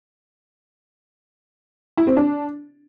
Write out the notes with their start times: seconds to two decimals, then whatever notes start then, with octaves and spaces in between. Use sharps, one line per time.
1.97 E4
2.07 C4
2.17 D4